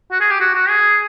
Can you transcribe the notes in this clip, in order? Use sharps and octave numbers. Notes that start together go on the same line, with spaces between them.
F#4
G#4
G4
F#4
F#4
G#4